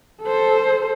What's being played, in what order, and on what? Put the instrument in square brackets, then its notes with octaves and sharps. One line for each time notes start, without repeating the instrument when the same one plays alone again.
[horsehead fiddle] A4 C5